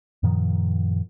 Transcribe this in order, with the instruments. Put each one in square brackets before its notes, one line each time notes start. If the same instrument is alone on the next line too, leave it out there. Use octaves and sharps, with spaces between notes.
[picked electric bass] F#2 A#2 D#3 F3